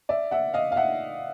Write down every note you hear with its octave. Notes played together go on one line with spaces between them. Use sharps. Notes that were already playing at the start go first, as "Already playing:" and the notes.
D5 E5
E5 F#5
D#5 F5
F5
E5 F#5